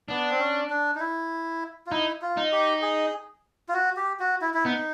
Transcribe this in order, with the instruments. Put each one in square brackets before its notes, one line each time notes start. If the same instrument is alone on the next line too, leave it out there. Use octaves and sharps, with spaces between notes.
[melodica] B3 [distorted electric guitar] D4
[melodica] C4
C#4
D4
D#4
E4
F4
[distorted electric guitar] D#4 [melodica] E4
[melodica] F4
[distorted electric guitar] D#4
[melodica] G4
G#4
F4
F#4
G4
F#4
E4
E4
[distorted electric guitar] B3 [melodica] D#4